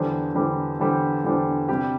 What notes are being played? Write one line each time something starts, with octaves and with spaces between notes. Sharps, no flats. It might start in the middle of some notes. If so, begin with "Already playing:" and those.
Already playing: E2 D3 G3 D4 C5
E2 D3 G3 D4 C5
E2 D3 G3 D4 C5
E2 D3 G3 D4 C5
C3 G3 D4 G4